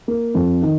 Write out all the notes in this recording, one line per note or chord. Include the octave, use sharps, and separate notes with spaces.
A#3
F2
D#3